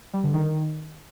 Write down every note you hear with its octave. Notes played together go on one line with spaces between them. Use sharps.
G3
D3
D#3